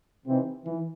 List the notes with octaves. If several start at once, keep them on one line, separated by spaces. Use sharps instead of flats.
C3 E3 C4 D#4
E3